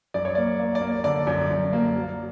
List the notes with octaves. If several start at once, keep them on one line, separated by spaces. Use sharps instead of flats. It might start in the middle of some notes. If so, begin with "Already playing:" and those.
F#2 D5
C#5
A#3 D5
A#3
D5
A#3
D3 D5
F#2
F#2
A#3
F#3